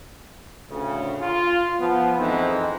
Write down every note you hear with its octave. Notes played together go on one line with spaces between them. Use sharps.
D2 A2 C#3
F4
F3 B3
F2 E3 G#3 C4 D#4